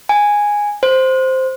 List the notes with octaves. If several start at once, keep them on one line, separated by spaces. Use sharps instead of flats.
G#5
C5